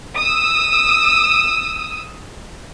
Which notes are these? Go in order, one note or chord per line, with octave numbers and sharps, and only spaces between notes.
D#6 E6